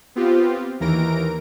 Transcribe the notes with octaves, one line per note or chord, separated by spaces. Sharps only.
B3 C4 F4 G4
D#2 E3 A#4 A#6 D7